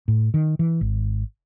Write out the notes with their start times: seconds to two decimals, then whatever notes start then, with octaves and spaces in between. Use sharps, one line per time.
0.08 A2
0.34 D#3
0.59 E3
0.81 G#1